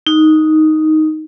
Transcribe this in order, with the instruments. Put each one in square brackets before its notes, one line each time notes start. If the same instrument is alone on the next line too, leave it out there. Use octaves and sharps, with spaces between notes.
[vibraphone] D#4